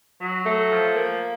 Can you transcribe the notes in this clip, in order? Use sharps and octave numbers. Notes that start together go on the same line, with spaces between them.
F#3
A3
F3
A#3